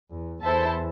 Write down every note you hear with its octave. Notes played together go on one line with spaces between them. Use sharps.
E2
E2 E4 A4 C5 E5 A5